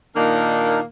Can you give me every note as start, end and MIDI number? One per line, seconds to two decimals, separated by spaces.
0.15 0.83 46
0.15 0.83 51
0.15 0.83 58
0.15 0.80 62
0.15 0.80 63
0.15 0.80 89